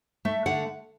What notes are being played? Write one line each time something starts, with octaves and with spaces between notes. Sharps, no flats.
A3 E5
D3 F#5